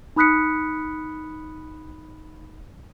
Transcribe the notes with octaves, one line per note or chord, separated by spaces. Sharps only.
D#4 B5 D#6 F#6 B6 C#7